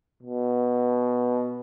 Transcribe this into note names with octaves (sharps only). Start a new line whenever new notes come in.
B2